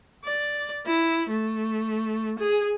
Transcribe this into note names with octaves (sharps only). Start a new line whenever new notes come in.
D5
E4
A3
G#4